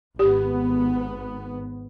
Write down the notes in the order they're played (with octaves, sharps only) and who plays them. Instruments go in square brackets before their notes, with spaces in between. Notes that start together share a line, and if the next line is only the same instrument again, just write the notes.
[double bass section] G#1 B3 [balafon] G4